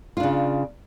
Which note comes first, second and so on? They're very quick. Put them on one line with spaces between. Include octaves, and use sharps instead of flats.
F4 D4 C#3